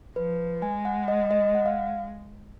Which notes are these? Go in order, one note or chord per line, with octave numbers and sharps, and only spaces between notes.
F3 B4
G#3 G#5
F#5
D#5
D#5
F#5
F5